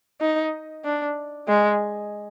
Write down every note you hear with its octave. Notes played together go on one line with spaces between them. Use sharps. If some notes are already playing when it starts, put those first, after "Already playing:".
D#4
D4
G#3